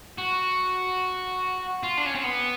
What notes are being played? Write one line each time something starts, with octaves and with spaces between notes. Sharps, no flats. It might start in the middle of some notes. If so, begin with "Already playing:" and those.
F#4
F4
D4
C#4
C4
B3